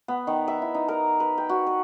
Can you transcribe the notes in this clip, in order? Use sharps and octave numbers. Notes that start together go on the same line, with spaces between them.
B3
D#3
E5
E4
D#4
A#4
B4
G5
F#4
B4